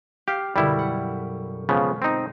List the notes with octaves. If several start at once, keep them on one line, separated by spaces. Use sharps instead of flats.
G4 F5 F6 C7
F#2 B2 D3 G3 E4
F#5
C#3 F3 G#3 B3
C4 D#4